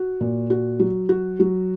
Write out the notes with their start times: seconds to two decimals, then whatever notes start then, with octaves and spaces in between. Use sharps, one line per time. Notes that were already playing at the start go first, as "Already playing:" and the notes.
Already playing: F#4
0.21 A#2
0.50 F#4
0.80 F#3
1.09 F#4
1.40 F#3